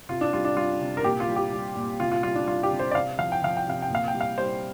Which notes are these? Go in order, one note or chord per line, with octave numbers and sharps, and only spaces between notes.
C3 F4
D4
G3 F4
D4
G3 F4
C3
A#4
A#2 G4
F4
G3
G4
G3
A#2
C3 F4
F4
G3 F4
D4
G3 F4
G4
C3
C5
D5
C3 F5
F3 F5
G5
F3 F5
G5
C3 F5
G5
A#2 F5
G5
G3
F5
G3 C5